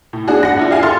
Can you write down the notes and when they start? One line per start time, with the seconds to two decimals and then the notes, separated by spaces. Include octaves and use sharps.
0.13 A2
0.28 D4 F#4 G#4
0.43 F#5 A#6
0.57 D4 E4 F4
0.71 E4 G4 F5 G#5
0.83 A4 C6 F6 A6